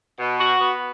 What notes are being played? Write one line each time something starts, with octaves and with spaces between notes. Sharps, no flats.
B2
F#4
B3